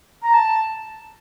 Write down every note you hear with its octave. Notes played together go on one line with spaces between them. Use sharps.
A#5
A5